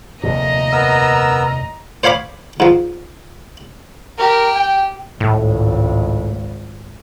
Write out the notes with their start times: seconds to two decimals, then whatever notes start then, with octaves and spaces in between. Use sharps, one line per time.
0.23 F1 D#2 A#2 D#5 A#5
0.72 B3 A#4 E6
2.03 C5 C#5 F5 B5 D6
2.60 G#2 F3
4.18 G4 A#4
4.56 G5
5.20 G#1 C#2 A2